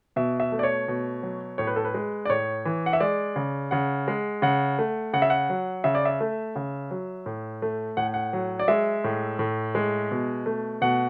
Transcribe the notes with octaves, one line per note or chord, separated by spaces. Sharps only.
B2 E5
E5
A3
D5
C#5
B2
F#3
A2 C#5
B4
A4
B4
G#3
D5
A2 C#5
E3
F#5
E5
G#3 D5
C#3
C#3 F#5
G#3
C#3 F#5
A3
C#3 F#5
E5
F#5
F#3
C#3 E5
D5
E5
A3
C#3
F#3
A2
A3
A2 F#5
F#5
F#3
D5
G#3 E5
A2
A2
G#3
B2
A3
B2 F#5